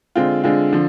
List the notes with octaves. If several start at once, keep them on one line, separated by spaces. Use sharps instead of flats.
D3 G#3 C4 F4
D3 G#3 C4 F4
D3 F3